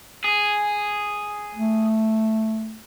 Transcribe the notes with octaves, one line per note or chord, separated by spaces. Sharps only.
G#4
A3